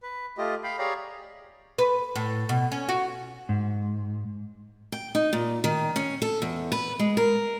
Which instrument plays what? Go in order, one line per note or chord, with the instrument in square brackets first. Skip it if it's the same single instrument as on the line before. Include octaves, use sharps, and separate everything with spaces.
[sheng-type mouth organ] B4
A3 F4 G4 D#5
F5 G5 B5
G4 G#4 C#5 D5 F5 A#5
[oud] B4
A2
B2
C#4
F#4
[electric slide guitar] G#2
[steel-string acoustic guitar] G5
D#4
A#2
D#3
C#4
A4
E2
B4
G#3
A#4